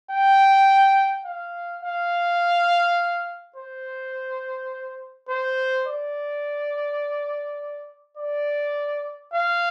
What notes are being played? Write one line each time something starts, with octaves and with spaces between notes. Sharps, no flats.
G5
F5
F5
C5
C5
D5
D5
F5